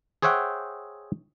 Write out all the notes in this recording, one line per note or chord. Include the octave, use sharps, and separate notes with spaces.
G#4 C5 C#5 E5 F#5 G5